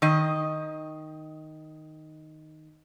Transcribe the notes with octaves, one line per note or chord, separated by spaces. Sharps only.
D#3 D#5